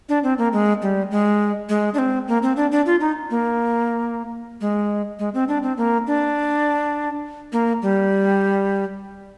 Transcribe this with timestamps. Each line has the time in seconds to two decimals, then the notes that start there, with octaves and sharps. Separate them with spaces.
0.09 D4
0.24 C4
0.38 A#3
0.53 G#3
0.82 G3
1.11 G#3
1.69 G#3
1.94 D4
1.98 C4
2.28 A#3
2.43 C4
2.56 D4
2.72 D4
2.86 F4
3.01 D#4
3.30 A#3
4.61 G#3
5.19 G#3
5.34 C4
5.48 D4
5.63 C4
5.77 A#3
6.07 D4
7.52 A#3
7.82 G3